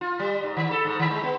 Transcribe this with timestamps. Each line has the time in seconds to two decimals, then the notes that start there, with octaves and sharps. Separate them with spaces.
0.01 F4
0.19 G3
0.43 G#2
0.57 D#3
0.71 A4
0.85 G#2
0.99 D#3
1.11 G#3
1.23 B3